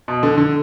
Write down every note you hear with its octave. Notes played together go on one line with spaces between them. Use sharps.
B2
D3
D3